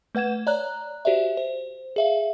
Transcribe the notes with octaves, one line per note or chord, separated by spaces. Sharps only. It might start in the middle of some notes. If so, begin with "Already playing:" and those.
A3 B4 F#5 G#6 E7
C#5 D5 A#5 F#6
F#4 G4 C5 D5 E5
C5
G#4 E5 F5